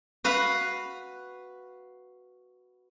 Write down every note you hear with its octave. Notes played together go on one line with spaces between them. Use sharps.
F#4 B4 F5